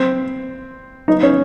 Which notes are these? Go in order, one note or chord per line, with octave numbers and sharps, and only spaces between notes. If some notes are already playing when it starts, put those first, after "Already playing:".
Already playing: C4
D#4
C#4